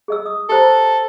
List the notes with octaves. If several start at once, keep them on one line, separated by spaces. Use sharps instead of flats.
G#4 D#5 E6
D#6
G4 A4 C5 A#5